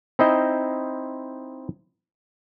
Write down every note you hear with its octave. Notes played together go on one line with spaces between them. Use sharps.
C4 D#4 E4 C5 D#5